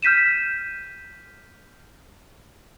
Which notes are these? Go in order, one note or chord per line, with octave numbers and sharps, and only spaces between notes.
F6 G6 B6 D#7 E7